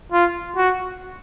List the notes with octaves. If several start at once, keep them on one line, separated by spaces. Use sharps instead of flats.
F4
F#4